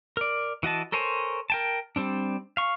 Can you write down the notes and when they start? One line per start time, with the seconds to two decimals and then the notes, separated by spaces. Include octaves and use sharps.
0.17 A#4 D5
0.63 E3 F#4 D#5 A5
0.92 A4 A#4 C5 C#5 G#5
1.50 A#4 G5 A5
1.96 G3 C4 D4
2.57 F5 C#6